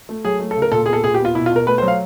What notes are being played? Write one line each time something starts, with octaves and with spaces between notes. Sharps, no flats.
A3
F#3 G#4
A3
A4
C#3
A#4
A#2 A4
B3 G#4
A4
A#2 G#4
G4
B3
F4
B2 E4
F4
B2 A#4
A3 B4
C5
F#3
F5